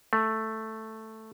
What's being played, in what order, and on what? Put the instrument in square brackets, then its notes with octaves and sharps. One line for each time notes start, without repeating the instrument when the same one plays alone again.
[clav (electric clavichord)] A3